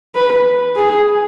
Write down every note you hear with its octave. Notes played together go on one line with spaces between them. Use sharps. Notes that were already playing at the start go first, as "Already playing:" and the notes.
B4
G#4